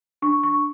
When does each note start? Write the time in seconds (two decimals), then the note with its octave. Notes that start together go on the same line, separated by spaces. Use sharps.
0.22 D4 C#6
0.43 C#6